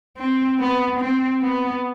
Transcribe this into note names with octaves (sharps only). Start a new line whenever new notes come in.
C4
B3
C4
B3